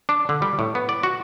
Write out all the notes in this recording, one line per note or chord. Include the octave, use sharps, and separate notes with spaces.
D4
D3
G3
A2
B3
D5
F#4